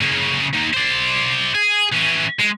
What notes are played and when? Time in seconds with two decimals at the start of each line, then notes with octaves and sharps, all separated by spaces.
0.01 C#3 A#3
0.53 D#3 A#3
0.74 C5 D5
1.55 G#4
1.92 E3 C#4
2.40 G#3